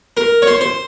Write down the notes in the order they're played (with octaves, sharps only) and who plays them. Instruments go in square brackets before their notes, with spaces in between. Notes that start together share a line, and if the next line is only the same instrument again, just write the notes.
[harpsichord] A#4
C#5
C5
C5